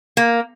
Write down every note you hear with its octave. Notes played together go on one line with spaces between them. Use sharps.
A#3